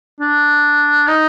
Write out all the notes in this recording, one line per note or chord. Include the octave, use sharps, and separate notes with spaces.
D4
D#4